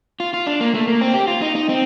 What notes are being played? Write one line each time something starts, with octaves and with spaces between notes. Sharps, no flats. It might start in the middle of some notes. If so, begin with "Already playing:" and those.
F4
F4
D4
A#3
A3
A#3
C4
G4
F4
D#4
D#4
C4